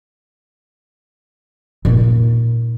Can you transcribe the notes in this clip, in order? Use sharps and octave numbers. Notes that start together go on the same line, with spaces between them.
A#2 D#4